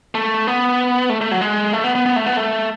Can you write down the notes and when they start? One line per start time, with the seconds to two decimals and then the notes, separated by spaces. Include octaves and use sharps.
0.15 A3
0.47 B3
1.09 A3
1.21 A3
1.31 F#3
1.41 G#3
1.73 A3
1.84 B3
1.95 B3
2.06 B3
2.16 A3
2.26 B3
2.37 A3